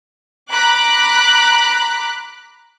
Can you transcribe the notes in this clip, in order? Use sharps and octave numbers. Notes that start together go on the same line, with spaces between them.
A#5 B5 D6 F#6